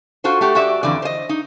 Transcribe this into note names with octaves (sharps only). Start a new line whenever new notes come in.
F4 F#4 A4 C5
A3 F#4 G4
F#4 G4 D5 E5
F2 D3 E3 D5
C5 D#5
D#4